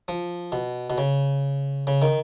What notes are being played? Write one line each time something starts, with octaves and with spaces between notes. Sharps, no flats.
F3
B2
B2
C#3
C#3
D#3